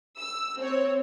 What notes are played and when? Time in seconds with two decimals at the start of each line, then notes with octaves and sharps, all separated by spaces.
0.18 E6
0.59 C4 C#5